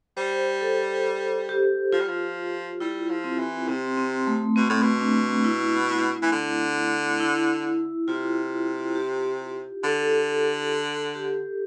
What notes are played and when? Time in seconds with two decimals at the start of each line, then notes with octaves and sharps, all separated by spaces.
0.17 G3 C5
0.61 A4
1.05 A4
1.49 G4
1.93 F3 F4
2.00 G3
2.08 F3
2.80 G3 E4
3.10 F3
3.24 C4
3.39 E3
3.68 C3 C4
3.98 C4
4.27 A3
4.56 B2 C4
4.69 A2
4.82 B2
5.00 D4
5.44 E4
6.22 E3
6.32 D3
7.20 E4
8.08 C3 F4
8.95 G4
9.83 D3 A4
11.15 G4